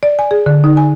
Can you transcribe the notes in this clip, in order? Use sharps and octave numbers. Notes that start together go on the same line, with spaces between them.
D5
G#5
G#4
D3
D#4
G#5